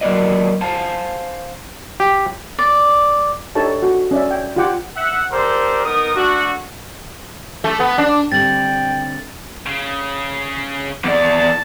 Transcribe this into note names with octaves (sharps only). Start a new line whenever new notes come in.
F#3 A#3 A#4 B4 D5 D#5
C5 F5 G#5 A5
G4
D5
D4 D#4 G4 A4 C#5 A5
F#4
C#4 D5 E5
G5
F4 G4 F#5 G5 D6
E5 F#5
G4 A4 A#4 C5 D5
B3 D#4 A#4 D#6
A3 D4 F#4
A3
B3
D4
D3 G3 C4 G5 A6 F#7
C#3
E2 D5 A5